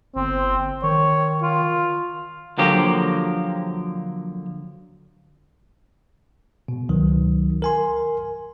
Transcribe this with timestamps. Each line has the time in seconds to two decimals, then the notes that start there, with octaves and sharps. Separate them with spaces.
0.16 G1 C4
0.83 D#3 C#5
1.43 F4
2.58 D3 F3 F#3 A#3 G4
6.68 B2
6.89 C#2 D#3 F#3
7.62 A#4 G#5 C6